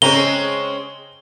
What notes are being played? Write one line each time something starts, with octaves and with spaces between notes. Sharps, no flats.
C#3 G#3 C4 C#4 A#5 G7